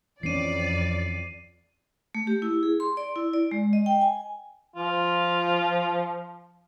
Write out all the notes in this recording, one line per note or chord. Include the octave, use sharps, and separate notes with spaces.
F2 E3 C4 C#4 D5 C7 D#7
A3
G4
E4
G#4
C6
D5
E4
D5
G#3
D#5
G5
G#5
F3 F4